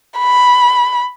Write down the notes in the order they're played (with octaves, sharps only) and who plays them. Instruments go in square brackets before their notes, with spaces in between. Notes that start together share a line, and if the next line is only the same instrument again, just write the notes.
[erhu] B5